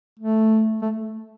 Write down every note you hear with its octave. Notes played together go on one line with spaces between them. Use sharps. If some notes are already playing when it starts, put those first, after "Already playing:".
A3
A3